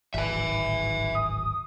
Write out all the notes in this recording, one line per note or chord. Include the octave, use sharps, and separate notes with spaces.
D1 G#1 E5 G#5
D#6